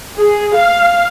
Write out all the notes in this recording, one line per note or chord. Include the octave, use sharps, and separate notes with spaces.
G#4
F5